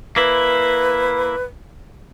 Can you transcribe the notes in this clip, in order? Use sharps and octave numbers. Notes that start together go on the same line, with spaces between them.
A#3 E4 B4